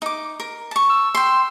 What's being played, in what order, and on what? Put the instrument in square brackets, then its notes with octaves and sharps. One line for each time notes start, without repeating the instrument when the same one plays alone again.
[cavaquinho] D#4 D6
A#4
A5 C#6
[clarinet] E6
[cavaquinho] G5 C6